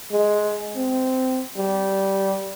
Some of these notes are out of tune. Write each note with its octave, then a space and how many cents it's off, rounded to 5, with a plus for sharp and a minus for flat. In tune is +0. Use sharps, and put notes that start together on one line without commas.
G#3 +10
C4 -15
G3 -15